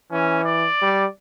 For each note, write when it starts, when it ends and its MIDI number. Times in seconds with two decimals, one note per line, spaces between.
0.12 0.67 52
0.12 0.40 61
0.44 1.08 74
0.82 1.07 55